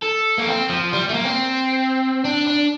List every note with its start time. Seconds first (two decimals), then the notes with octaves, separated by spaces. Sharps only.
0.03 A4
0.38 A#3
0.48 C4
0.69 F3
0.92 G3
1.09 A3
1.14 A#3
1.25 C4
2.25 D4
2.47 D4